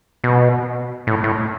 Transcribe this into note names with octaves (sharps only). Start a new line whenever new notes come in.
B2
A2
A2